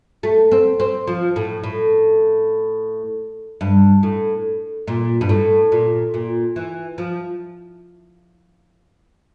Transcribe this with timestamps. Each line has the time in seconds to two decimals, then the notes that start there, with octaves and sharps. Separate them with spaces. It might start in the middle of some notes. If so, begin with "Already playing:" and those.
0.23 A3
0.52 C4
0.80 C4
1.07 F3
1.36 A2
1.63 A2
3.61 G2
4.03 A2
4.87 A#2
5.21 G2
5.29 A2
5.72 A#2
6.14 A#2
6.56 E3
6.98 F3